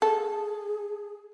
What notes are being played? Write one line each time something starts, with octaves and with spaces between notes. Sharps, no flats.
G#4 A4